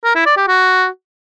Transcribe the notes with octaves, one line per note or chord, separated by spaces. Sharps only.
A#4
E4
D5
G4
F#4